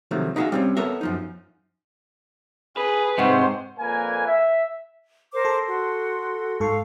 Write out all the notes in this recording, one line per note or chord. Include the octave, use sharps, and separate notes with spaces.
C3 D#3 F3 F#3 A3
D#4 E4 F#4 G#4 E5 F5
G3 C4 C#4
B3 A4 A#4 C#5 E5
F#2 F3 D#4
G#4 B4
G#2 C3 C5 D#5 F#5 C#6
F2 A#2 A#3 B4 G#5
E5
A#4 C5 D6
A4 C6
F#4
G#2 A4 F5 C#6